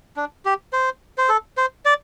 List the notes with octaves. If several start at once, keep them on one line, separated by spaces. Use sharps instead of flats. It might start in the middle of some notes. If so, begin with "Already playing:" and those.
D4
G4
C5
C5
A4
C5
D5